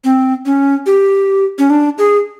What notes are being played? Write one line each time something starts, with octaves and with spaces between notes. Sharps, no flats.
C4
C#4
G4
C#4
D4
G#4